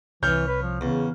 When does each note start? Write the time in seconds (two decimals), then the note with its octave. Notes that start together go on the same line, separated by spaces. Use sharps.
0.23 C2 E3 C#5 F6 G6
0.48 B4
0.62 F3
0.81 E2 C#3